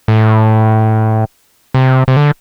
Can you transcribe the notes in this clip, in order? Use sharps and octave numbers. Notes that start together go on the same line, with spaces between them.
A2
C3
C3
D3